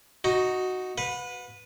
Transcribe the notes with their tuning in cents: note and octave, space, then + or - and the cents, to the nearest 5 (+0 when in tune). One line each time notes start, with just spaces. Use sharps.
D#4 +0 F#4 +0
B4 +0 F#5 -40